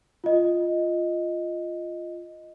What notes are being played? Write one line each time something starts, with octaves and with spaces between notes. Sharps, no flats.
F4 D#5